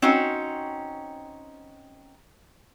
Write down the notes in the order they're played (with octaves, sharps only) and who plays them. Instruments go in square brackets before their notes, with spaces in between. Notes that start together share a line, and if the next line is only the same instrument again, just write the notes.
[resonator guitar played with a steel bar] C4 C#4 D#4 F#4